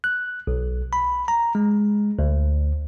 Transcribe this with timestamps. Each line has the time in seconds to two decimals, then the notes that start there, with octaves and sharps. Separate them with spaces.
0.04 F#6
0.47 B1
0.93 B5
1.28 A#5
1.55 G#3
2.19 D2